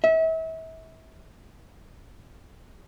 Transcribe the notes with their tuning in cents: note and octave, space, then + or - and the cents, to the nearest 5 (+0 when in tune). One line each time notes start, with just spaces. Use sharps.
E5 -35